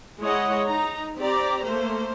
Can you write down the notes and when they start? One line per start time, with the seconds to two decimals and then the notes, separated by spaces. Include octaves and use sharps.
0.20 G#3 E4 C#5 D#5 F#5
0.66 D#4 A#5
1.17 C4 G4 D5 A#5
1.64 A3 A#3 C5